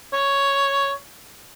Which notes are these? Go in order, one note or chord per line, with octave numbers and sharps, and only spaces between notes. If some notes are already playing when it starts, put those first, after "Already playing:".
C#5